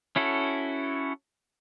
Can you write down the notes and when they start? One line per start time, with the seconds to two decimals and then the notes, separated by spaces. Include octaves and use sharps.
0.16 C#4 E4 F#4 A4